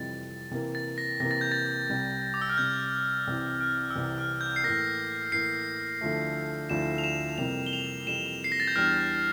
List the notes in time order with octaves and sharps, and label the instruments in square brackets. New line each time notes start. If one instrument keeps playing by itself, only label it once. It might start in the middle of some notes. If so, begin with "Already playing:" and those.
Already playing: [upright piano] F2 C3 E3 G3 [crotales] A6
[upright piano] C3 E3 A#3
[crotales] A6
A#6
[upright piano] C3 E3 A#3 [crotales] A#6
[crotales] A6
G6
A6
[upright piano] C2 C3 G3
[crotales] D6
E6
F6
[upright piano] C2 C3 G3 [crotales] G6
[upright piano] C2 C3 E3
[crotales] F6
E6
[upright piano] C2 C3 E3 [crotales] F6
[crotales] F6
G6
C7
[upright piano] A2 E3 A#3 [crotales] A#6
[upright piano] A2 E3 A#3 [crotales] C7
[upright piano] D2 D3 F3 A3 E4
[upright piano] D2 D3 F3 A3 E4 [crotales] E7
[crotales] F7
E7
[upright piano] F2 C3 E3 G3 A#3 [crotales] F7
[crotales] G7
F7
[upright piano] F2 C3 E3 G3 A#3 [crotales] E7
[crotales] C7
A#6
A6
G6
[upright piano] E2 E3 G3 D4 [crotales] F6